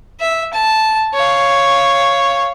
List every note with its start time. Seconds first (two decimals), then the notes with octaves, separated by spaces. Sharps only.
0.20 E5
0.53 A5
1.14 C#5 F5